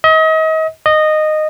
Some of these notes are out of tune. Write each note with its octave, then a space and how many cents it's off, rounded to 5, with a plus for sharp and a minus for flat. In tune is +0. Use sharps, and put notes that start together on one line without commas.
D#5 +35
D#5 -15